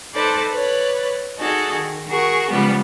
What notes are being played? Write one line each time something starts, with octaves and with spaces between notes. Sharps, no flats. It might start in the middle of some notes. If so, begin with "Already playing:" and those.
D#4 A4 B4 C5 D5 A5
B4 C#5 D5
D#4 F#4 G#4 A4 D5
D#3
F#4 G#4 A#4 C#6
C#3 F3 G3 G#3 B3